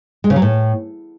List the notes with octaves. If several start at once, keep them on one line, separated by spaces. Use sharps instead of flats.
G#3
C#3
F#3
A2